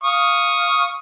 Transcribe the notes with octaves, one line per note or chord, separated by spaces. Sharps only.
F5 C#6 D#6